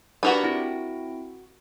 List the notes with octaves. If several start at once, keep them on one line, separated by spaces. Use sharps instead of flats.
D4 F#4 G4 A#4 B4 D5
C4 E4 D7